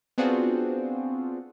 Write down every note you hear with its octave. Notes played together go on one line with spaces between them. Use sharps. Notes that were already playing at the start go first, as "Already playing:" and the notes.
B3 C4 D4 F4 F#4 G#4